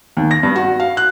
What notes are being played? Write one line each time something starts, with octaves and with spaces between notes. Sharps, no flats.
D#2
A#6
G2
F#4
F5
F#6